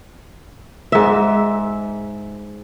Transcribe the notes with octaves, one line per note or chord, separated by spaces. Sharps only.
G#2 E5